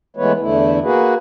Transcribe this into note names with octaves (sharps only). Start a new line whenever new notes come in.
E3 G#3 A3 B3 B4 C#5
E2 D3 A3 E4
A#3 F#4 G#4 B4